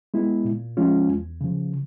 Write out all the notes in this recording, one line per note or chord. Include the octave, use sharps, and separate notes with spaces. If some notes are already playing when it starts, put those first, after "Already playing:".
G#3 B3 E4
A#2
F3 G#3 C#4 F4
E2
C#3 F3